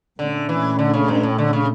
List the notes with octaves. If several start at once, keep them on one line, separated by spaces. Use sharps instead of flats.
A#2 D3 A3 C#4
E3
D3
C#3
G2
A2
D3
C#3